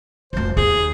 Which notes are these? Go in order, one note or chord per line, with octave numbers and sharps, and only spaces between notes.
F1 F#2 C5
D#2 G#4